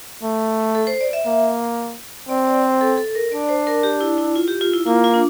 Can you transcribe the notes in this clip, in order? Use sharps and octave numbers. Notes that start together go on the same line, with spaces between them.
A3
A4
C5
D5
E5
A#3
C4 D5
D5
C5
A4
A4
A#4
D4 D5
C5
A#4
G4
E4
E4
F4
G4
F4
E4
A#3 F4
F4
D4